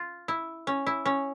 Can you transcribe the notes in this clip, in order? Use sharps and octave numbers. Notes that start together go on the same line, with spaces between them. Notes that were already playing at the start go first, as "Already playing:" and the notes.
Already playing: F4
E4
C#4
E4
C#4